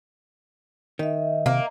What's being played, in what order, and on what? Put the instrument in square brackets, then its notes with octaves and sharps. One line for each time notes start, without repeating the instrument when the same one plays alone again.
[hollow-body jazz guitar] D#3 [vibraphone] D#5 E5
[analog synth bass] C3 [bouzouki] A#3